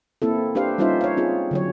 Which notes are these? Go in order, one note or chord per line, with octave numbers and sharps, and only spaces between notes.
A#3 C4 E4 A4
D4 G4 B4 C5 F5
G3 C#4 D#4 F4 C5 E5
C#5 F5
C4 F4 G#4
D3 F#3 C#5